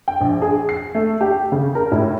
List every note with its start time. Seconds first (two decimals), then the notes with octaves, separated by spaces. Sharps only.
0.08 G5
0.21 A#1
0.42 G#4
0.69 C7
0.95 A3
1.21 G4
1.52 C#3
1.75 A#4
1.92 A2